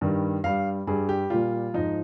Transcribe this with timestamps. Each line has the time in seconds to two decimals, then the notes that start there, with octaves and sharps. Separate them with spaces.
0.01 G2 D#3 G3
0.44 G2 G3 F5
0.87 G2 G3 G#4
1.09 G4
1.30 A#2 G3 F4
1.74 G#2 F3 D#4